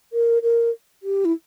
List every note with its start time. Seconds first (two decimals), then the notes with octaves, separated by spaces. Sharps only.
0.13 A#4
0.43 A#4
1.03 G4
1.25 E4